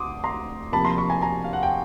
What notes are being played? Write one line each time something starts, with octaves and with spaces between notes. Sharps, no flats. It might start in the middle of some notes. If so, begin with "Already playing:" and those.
Already playing: D2 C6 D6 D#6
A#5 C6
C3 F3 A#3 A5 B5
A#5 C6
B5 C#6
G#5 A#5
G#5 A#5
F5
F#5
G5